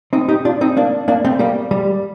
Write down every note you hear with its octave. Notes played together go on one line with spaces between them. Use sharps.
C4 D#4
D#4 G4
D4 F4
C4 D#4
A#3 D4
A#3 D4
A3 C4
G3 A#3
G3